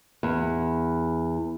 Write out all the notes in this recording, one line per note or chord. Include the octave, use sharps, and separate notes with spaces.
E2